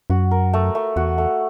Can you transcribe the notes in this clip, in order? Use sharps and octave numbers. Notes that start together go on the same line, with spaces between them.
F#2 F#4
A#4
A3
A3
E2 F#4
A3